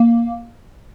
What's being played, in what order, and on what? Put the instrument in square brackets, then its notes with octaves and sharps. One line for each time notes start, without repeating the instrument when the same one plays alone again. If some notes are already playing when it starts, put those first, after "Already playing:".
Already playing: [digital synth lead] A#3